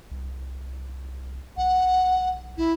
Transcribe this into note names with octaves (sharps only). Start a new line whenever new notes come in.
C2
B1 F#5
B1 E4